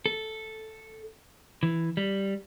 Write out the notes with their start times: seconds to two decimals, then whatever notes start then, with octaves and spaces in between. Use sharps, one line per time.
0.06 A4
1.63 E3
1.97 G3